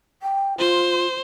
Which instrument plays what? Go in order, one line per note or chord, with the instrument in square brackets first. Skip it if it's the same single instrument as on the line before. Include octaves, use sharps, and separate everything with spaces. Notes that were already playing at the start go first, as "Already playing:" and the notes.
[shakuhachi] G5
[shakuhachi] F4 [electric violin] C5